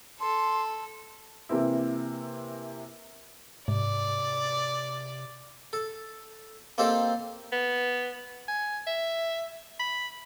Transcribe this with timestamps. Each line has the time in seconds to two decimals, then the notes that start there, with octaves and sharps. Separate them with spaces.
0.20 A4 C6
1.49 C3 E3 A#3 C4 E4
3.68 G#2 C3 D5
5.73 A4
6.78 A#3 C4 D#4 G4 A4 C5
7.52 B3
8.48 G#5
8.87 E5
9.80 B5